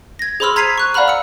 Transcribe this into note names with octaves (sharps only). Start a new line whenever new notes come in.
G#6 A#6
G#4 C5 B5 C6 E6 F6
A#5 G#6 B6 C7 D#7 F7
C#6 F#6
D5 F5 F#5 A#5 B5 F6
E6 C#7